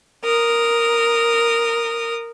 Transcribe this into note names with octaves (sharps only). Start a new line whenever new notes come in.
A#4 D#6